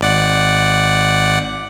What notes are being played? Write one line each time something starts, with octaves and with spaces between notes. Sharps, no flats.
G#1 D5 F#5